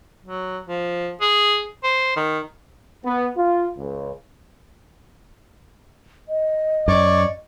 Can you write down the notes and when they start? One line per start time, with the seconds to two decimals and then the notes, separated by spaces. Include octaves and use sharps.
0.24 F#3
0.67 F3
1.21 G#4
1.84 C5
2.16 D#3
3.05 B3
3.37 F4
3.77 C#2
6.29 D#5
6.88 F#2 C#5 D5